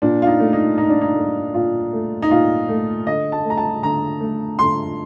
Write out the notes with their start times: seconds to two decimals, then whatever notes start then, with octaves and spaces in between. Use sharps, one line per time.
0.02 A#2 D4
0.22 F4
0.27 D#4
0.40 A3
0.53 D#4
0.78 A#2 D#4
0.89 D4
1.01 D#4
1.16 A3
1.54 A#2 F4
1.93 A3
2.22 D#4
2.31 A#2 F4
2.69 A3
3.06 D3 D#5
3.32 A5
3.45 A3
3.50 A#5
3.57 A5
3.83 D3 A#5
4.20 A3
4.59 D3 C6